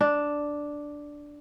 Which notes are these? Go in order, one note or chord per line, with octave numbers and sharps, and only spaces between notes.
D4